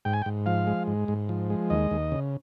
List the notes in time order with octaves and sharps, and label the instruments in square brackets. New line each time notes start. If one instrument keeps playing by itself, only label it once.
[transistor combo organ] G#2 G5
G#5
G5
G#2
F3 F5
G#3
G#2
G#2
F3
G#3
D#2 D#5
D#2
C#3